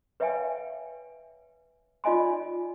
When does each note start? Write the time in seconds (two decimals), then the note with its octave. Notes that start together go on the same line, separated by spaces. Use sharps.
0.20 B4 C#5 E5 F5 G5 G#5
2.04 D#4 F4 D5 D#5 G#5 C6